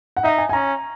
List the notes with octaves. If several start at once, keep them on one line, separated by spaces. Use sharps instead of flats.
F#5
D#4 E5
G#5
G#5
C#4 A#5